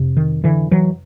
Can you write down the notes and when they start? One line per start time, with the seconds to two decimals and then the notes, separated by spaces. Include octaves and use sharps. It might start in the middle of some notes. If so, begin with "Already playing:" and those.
Already playing: F2 C3
0.17 D#3
0.44 D3 E3
0.71 E3 F#3